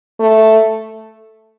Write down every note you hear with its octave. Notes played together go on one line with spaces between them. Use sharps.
A3